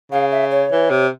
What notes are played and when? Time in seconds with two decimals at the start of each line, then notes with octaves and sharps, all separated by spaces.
0.12 C#3 F5
0.32 E5
0.51 C#5
0.71 E3
0.90 C3